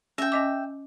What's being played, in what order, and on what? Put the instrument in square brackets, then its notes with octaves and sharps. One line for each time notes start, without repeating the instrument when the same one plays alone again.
[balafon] C#4 [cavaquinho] E5 G5
[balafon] C#4 D#5 D6